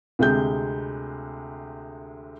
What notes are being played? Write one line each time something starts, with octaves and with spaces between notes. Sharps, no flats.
D2 C3 G#3 G6